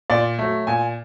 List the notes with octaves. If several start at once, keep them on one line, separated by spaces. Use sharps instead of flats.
A#2 D5
F#3 A3
A#2 G#5